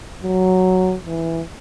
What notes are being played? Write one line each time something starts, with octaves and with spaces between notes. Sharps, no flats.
F#3
E3